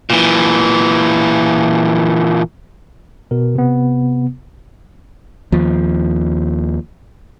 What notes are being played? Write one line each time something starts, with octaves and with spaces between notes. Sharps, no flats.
A#2 E3
B2 A#4
C3 B3
D#2 F3